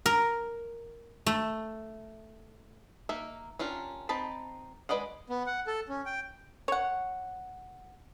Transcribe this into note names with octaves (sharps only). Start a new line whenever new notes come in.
A#4
A3
A#3 D#4 E5
C#4 D4 F4 G4 A#4
C4 D#4 A5 B5
G#3 B4 D5 D#5 F#5
B3
F#5
A4
C#4
G5
C#5 F#5